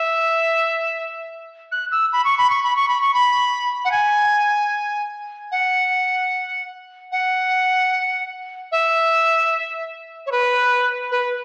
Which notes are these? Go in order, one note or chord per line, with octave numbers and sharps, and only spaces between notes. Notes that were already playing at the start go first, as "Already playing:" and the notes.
Already playing: E5
F#6
E6
B5
C#6
B5
C#6
B5
C#6
B5
C#6
B5
F#5
G#5
F#5
F#5
E5
C#5
B4
B4